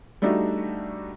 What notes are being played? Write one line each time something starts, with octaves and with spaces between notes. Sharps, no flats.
G3 A3 D4 D#4 F#4